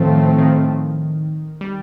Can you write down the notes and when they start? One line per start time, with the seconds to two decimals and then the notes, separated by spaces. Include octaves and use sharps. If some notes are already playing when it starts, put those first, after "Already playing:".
Already playing: A2 D#3 F3 A3 C4
0.38 D#3
1.61 G3